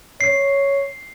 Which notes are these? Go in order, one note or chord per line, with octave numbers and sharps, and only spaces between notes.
C#5 C7